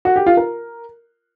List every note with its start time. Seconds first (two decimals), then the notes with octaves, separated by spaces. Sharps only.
0.05 F#4
0.16 G4
0.26 F4
0.37 A#4